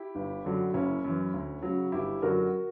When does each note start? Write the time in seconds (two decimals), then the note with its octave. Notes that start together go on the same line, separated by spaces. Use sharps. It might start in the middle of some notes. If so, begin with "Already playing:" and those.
Already playing: E4 G4
0.15 G1
0.45 F#2 D3 F#3
0.74 F#1 C#4 E4
1.04 F#2 E3
1.34 D2
1.63 C#3 F#3
1.92 G1 E4 G4
2.22 F#2 D3 F#3 F#4 A#4